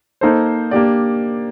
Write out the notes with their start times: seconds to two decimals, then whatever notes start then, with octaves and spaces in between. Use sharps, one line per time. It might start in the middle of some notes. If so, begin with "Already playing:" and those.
0.21 A#3 D#4 A4 C5
0.71 A#3 D4 G4 D5